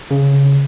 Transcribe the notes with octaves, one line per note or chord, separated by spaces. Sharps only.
C#3